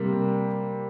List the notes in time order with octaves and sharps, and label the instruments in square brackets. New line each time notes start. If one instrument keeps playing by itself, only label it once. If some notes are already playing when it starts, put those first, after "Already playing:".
Already playing: [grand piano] C3 G3 A#3